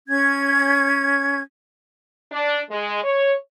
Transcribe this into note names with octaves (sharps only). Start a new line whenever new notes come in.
C#4 G#6
D4
G#3
C#5